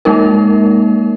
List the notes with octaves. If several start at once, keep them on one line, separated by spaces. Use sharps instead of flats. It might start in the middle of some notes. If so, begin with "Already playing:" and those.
G#3 A#3 D#4 A#4